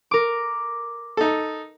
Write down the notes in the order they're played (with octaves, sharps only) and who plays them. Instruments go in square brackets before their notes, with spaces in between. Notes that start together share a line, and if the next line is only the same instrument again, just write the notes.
[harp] A#4 D6
[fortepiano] D#4 A4